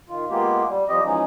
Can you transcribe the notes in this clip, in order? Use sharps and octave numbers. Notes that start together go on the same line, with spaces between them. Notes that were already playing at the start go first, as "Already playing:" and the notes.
D#3 F4
G#3 A#3 B3 F4 G4
G3
F3 G3 C4 G4 D#5
E3 F3 G#3 C#4 D#4